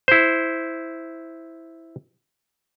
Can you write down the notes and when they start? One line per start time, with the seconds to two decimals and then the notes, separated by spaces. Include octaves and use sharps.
0.08 E4 C5